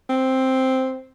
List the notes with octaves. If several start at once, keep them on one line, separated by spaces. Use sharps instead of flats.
C4